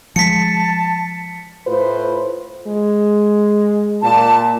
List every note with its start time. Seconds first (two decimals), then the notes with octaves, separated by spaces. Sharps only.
0.16 F3 G#3 A5 B6 C#7
1.67 A2 F4 B4 C5
2.67 G#3
4.03 A#2 A5